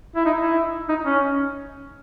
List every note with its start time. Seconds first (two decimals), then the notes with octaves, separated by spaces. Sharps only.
0.16 E4
0.26 D#4
0.42 E4
0.89 D#4
1.05 C#4